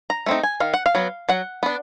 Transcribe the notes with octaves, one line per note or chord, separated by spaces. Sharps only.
A#5
A3 C4 D#4
G#5
D#3 F5
F#5
F5
F#3 B3
F#3 F#5
B3 D4